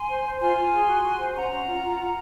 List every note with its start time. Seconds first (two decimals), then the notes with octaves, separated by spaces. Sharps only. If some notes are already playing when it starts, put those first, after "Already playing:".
Already playing: G#5 C6
0.09 C5
0.24 C5
0.40 F4 G#5 C6
0.56 F4
0.72 G#4
0.87 F#4
1.04 F#4
1.19 C5
1.35 C#4 F#5 A#5
1.51 C#4
1.67 F4
1.82 F4
1.99 F4